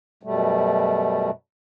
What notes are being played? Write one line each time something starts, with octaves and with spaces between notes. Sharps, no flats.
F#2 B2 G3 A3